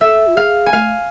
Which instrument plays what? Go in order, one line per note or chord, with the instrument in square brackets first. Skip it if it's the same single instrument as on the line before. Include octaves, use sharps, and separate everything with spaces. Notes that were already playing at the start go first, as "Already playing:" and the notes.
[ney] A4 [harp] E5
[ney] F4
[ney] G#4 [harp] F5
[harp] G#5
[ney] A3 [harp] F5